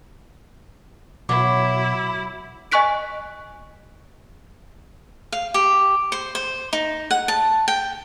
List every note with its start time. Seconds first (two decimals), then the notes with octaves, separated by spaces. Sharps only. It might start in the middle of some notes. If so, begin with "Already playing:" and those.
1.29 B2 F#3 E4 D6
2.72 D#5 G#5 C#6 F#6 B6 D7
5.32 F5
5.54 G4
6.12 C5
6.35 C5
6.73 D#4
7.11 F#5
7.28 A5
7.68 G5